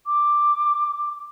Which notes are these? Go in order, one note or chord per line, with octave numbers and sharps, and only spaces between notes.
D6